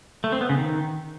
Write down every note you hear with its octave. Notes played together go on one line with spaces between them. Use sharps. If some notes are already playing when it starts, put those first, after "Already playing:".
A3
C4
B3
C#3
D#3